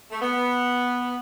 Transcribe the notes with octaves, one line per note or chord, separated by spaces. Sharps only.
A3
B3